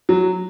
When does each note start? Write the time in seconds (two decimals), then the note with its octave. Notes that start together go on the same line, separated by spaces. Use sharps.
0.09 F#3